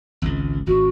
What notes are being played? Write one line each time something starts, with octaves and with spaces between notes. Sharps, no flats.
G#1 C#2
G#1 F#4